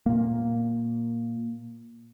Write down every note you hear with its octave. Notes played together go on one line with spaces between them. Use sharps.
A#2 A#3